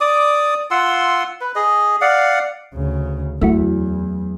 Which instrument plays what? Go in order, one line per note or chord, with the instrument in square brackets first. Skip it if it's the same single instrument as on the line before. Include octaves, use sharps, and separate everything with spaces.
[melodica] D5 D6 D#6
F4 F#5 C6 E6
B4
G#4 D#5
D5 F5 F#5
[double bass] D2 C#3
[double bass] E2 [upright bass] F#3 [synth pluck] A3 E4 F#4